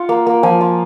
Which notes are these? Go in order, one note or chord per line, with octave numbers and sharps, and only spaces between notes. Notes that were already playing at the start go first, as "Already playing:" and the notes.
Already playing: F4 F#5
A#3
A#3
F3 G#5
F4